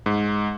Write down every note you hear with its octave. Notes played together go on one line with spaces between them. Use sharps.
G#2